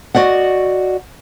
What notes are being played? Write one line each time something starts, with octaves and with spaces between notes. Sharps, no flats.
F#4 D5 D#5 F#5